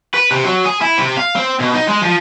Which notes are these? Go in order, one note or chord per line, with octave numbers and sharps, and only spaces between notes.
B4
C3
F#3
G#4
E4
C3
F5
C4
B2
D#4
G#3
F3